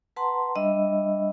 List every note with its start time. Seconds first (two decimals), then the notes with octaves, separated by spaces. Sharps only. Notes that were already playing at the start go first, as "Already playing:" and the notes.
0.16 B4 F#5 A5 A#5 C6
0.56 G3 D4 D#5 E5 B5 E6